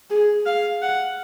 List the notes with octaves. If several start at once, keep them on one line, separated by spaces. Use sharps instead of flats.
G#4
F5
F#5